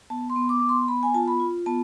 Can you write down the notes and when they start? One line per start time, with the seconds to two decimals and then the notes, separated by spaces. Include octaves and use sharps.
0.10 B3 A5
0.30 C6
0.36 B3
0.49 D6
0.60 B3 D6
0.69 C6
0.88 B3 B5
1.03 G#5
1.14 F4 A5
1.28 B5
1.40 F4
1.66 B3 A5